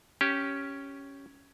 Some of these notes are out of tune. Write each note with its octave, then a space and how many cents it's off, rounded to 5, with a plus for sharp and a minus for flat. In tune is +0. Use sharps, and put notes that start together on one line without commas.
C#4 +0 G4 -5